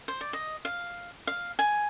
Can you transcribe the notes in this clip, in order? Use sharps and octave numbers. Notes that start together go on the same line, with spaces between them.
C5
D5
D#5
F5
F5
G#5